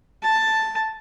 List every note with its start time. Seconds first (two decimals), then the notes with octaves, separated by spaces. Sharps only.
0.23 A5